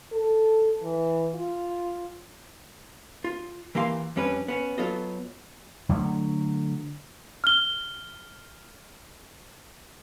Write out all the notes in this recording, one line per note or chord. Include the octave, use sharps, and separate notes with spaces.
A4
E3
F4
F4
E3 A#3 G4 F5 C6
F2 G3 C#4 D4 B4
B3 C#4
F#3 B3 F4 A4 D#5
D3 F#3 G3 A3
F6 G7